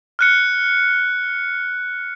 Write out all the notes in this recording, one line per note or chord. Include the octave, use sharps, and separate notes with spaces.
F6 F#6 C#7